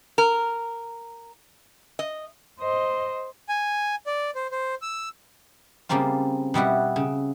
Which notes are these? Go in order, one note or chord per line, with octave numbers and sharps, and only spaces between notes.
A#4
D#5
C5 D#5
G#5
D5
C5
C5
E6
C#3 G3 A#3 C4 F4
B2 G3 E4 F#4
C#3